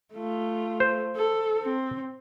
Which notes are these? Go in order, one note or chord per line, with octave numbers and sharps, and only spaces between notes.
A3 F4
C5
A4
C4